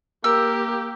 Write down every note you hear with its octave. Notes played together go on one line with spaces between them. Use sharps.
A#3 G4 A#4 E6